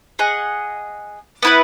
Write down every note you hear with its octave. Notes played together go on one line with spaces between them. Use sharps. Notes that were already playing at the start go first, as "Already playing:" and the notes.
G#4 D#5 F#5
B3 E4 B4